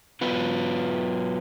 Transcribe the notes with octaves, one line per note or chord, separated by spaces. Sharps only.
F#3 B3 F4 B4